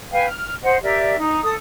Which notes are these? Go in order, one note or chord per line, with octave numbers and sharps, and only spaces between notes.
B4 F5 G5 G#5
F6
C5 D#5 F#5
G4 A#4 D5 E5
D#4
A4 D#6